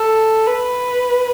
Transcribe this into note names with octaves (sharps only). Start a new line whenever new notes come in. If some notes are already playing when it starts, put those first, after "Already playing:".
Already playing: A4
B4